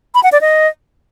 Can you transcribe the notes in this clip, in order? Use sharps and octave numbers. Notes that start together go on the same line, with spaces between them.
B5
F#5
D5
D#5